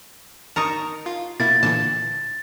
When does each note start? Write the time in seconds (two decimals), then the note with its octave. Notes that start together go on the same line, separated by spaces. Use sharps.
0.56 D#4 A#4 A5 A#5 C#6
1.06 F4
1.40 B2 A#3 E4 A6
1.63 A#2 D3 E3 A5